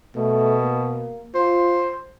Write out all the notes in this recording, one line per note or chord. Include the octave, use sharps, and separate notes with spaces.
B2 A3
A#3
F4 C5